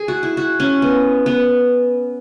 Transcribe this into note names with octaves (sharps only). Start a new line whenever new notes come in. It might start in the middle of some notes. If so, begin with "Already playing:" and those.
Already playing: G#4
F#4
E4
F#4
C#4
B3
B3